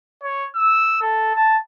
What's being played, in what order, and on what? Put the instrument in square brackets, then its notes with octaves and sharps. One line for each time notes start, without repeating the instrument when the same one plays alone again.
[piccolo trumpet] C#5
E6
A4
A5